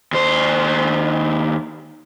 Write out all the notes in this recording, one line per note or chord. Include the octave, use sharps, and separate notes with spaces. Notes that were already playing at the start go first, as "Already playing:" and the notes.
D#2 C5